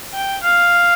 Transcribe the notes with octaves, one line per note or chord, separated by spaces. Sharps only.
G5
F5